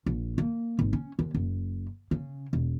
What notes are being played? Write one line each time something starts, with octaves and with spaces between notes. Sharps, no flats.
A#1
A#3
G#1
C#4
D#2
F#1
C#3
E1